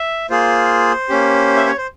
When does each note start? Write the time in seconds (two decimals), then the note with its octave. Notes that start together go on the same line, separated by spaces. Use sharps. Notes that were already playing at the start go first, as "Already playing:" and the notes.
Already playing: E5
0.30 A#3 F4 G#4 C5
1.09 A#3 C#4 G4
1.56 E5
1.67 C#5
1.77 C5